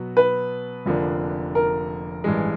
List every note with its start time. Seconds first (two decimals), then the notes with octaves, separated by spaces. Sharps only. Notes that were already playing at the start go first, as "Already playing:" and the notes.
Already playing: B2 F#3 B3
0.17 B4
0.86 F1 F2 D3 F3 A#3
1.55 A#4
2.24 A1 G2 E3 G#3